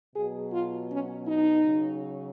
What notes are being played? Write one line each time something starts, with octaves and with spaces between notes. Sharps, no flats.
B2 F#3 G#4
F4
C#4
D#4
C#3 F#3